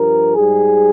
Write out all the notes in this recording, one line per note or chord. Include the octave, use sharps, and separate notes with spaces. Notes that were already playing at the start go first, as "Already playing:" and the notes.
Already playing: G2 F3 A#4
G#2 G3 G#4